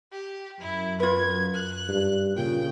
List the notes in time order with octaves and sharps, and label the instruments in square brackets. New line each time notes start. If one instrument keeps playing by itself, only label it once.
[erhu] G4
[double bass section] F#2 [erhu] E4
[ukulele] F4 B4 [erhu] G#6
[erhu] F#6
[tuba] G2
[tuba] A#2 [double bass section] C#3 [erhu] G5